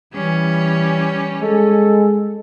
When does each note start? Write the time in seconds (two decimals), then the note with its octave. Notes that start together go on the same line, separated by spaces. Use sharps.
0.13 E3 G3 C#4
1.41 G#3 A4